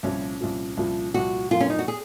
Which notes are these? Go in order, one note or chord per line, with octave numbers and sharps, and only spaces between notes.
C2 A#2 F3 C#4
C2 A#2 F3
C2 A#2 F3
C2 A#2 F3 F#4
F#2 F3 A#3 F4
C#4
D#4
F#4
G#4